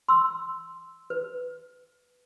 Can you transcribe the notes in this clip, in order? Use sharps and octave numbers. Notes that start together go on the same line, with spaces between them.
C6 E6
B4